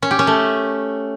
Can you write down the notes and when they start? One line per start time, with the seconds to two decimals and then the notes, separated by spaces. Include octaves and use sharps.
0.02 C#4
0.11 G4
0.19 C#4
0.27 A3